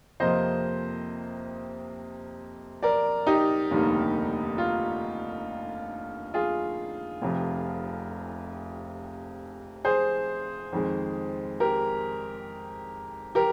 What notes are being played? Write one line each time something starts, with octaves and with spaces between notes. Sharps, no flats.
F2 C3 F3 A#3 C5 D#5
A#4 D5
D#4 G4
F1 D#2 D3 G3 A#3
F4
F4 G#4
F1 F2 C3
G#4 C5
F2 D#3 G#3
G4 A#4
G4 A#4